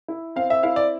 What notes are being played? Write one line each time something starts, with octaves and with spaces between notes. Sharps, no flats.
E4
C4 F5
E5
E4 F5
D5